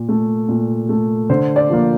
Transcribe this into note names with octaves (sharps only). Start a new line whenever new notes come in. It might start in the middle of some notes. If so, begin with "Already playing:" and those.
Already playing: A#2
A3
A#2
A3
D3 C5
D5
F3 A#3